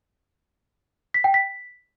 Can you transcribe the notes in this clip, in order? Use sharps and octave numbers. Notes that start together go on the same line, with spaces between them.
B6
G5
B6